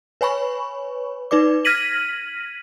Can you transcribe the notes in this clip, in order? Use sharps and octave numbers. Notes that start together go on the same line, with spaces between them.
B4 C#5 G#5 B5 C#6
D#4 B4 D5 D6
F6 G#6 A#6 B6 D#7 F#7